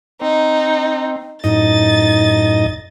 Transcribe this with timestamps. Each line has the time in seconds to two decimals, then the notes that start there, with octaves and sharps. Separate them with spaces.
0.21 C4 D#4
1.44 F#2 A2 D#4 D#5 A6